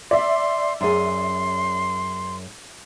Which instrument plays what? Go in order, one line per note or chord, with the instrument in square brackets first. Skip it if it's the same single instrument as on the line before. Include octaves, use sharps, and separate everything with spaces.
[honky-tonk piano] D5 E5 [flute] C6
[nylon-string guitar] F#2 G#4 [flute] C6